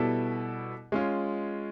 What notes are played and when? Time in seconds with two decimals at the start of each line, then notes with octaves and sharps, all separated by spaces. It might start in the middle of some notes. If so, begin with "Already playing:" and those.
Already playing: B2 G3 B3 E4 A4
0.92 G#3 C#4 F4